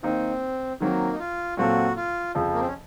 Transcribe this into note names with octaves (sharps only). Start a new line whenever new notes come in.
D#3 A#3 C4 D#4
D#3 F#3 A#3 C4
D#4
F4
A#2 F#3 C4 F4 F#4 A4
F4
F2 C#3 F3
A#3
C4
C#4